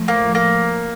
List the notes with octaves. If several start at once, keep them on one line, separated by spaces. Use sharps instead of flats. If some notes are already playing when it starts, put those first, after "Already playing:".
Already playing: A2 F3 A3
A#3
A#3